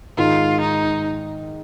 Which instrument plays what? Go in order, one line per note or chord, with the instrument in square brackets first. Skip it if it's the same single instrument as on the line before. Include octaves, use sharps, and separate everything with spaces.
[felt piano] G#2 D#3 G#3 D#4 [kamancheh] F4
[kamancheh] D#4